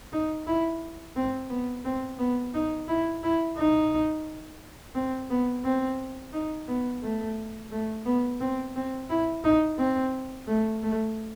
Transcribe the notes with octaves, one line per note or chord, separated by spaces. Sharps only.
D#4
E4
C4
B3
C4
B3
D#4
E4
E4
D#4
C4
B3
C4
D#4
B3
A3
A3
B3
C4
C4
E4
D#4
C4
A3
A3